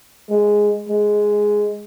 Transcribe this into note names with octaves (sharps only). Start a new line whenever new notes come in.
G#3
G#3